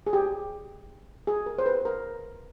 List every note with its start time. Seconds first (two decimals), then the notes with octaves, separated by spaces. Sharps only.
0.07 G#4
0.13 G4
1.27 G#4
1.46 A#4
1.58 C5
1.66 B4
1.85 A#4